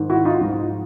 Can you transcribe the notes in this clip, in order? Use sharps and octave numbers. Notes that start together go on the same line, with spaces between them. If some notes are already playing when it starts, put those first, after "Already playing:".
Already playing: G#2 D#3
E4 F#4
D#4 F4
G#2 F3